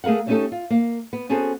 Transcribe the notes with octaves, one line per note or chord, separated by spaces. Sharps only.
A3 G#4 A#4 F5 F#5
G3 A3 C#4 D#4 G4 A4
F4
A#3
B3
B3 C#4 F#4 G#4 A4 C5